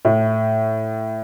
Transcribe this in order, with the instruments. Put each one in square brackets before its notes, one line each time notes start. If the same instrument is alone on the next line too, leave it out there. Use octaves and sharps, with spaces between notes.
[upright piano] A2